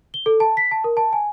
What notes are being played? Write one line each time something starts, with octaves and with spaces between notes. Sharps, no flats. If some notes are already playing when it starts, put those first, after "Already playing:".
G7
A4
A5
B6
A5
A#4
A5
G#5